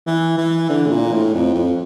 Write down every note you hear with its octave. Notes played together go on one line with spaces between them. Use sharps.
E3
E3
D3
A2
A#2
A2
F2
F2